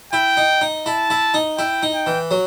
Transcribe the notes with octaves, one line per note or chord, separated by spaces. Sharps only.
E4 G5
D#4
D#4
E4 A5
E4
D#4
E4 G5
D#4
G5
E3
F#3